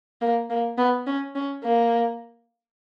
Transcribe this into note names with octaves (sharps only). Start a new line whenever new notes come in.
A#3
A#3
B3
C#4
C#4
A#3